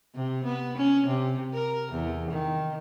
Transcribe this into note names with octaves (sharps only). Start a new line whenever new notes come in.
C3
B3
C#4
C3
A#4
E2
D#3